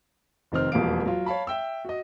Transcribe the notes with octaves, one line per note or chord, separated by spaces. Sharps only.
F1 D#3 C4 F6
E1 F2 G3 A#3 F5 D7
F#3 F4
C#5 F5 A5 B5
E5 G5 E6
F#4 D#5